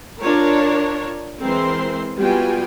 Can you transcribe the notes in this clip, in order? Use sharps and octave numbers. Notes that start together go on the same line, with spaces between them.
D4 F4 A#4 C#5
E3 G#3 C4 A#4 C5 C6
G3 B3 F4 F#4 G5 G#5